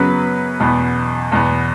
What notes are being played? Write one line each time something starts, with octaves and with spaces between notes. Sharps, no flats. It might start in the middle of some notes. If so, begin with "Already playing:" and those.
Already playing: F#2 C#3 F#3 B3 B4
E2 B2 B3
E2 B2 B3